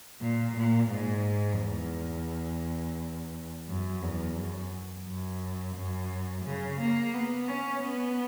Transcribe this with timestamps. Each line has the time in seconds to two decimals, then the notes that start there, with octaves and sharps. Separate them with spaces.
0.21 A#2
0.56 A#2
0.91 G#2
1.60 E2
3.68 F#2
4.03 E2
4.37 F#2
5.06 F#2
5.76 F#2
6.46 C#3
6.80 A#3
7.14 B3
7.48 C#4
7.83 B3